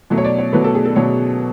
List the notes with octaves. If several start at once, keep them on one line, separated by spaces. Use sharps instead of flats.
B2 F#3 A3
C#5
D5
C#5
B2 F#3 A3 B4
A4
G#4
A4
B2 F#3 A3 C#5